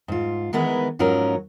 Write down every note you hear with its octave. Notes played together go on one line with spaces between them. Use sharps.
G#2 F4
D#3 E3 G#3 B3 A#4 B4
G#2 F3 F#3 C#4 A#4